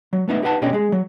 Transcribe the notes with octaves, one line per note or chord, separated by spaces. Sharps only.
F#3
A3 B3 D#4 E5
D#4 G4 B4 F#5 A5
D2 B2 D3 C#4 G4 D#5
G#3 G#4
F#3